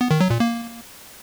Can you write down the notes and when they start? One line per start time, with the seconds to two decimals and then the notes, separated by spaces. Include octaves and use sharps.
0.01 B3
0.11 D#3
0.20 F#3
0.30 A#2
0.40 A#3